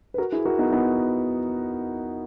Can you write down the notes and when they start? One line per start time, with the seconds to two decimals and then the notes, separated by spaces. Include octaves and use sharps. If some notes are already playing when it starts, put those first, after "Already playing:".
0.14 B4
0.18 F#4 A#4
0.32 E4 G#4
0.45 F#4 A#4
0.59 B3 D#4
0.72 B3 D#4